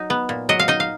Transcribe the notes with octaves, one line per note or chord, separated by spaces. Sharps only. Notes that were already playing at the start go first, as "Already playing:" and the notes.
Already playing: F#3 D#4
B3
A#2
F#3 D#5
F5
D#4 D#5
F5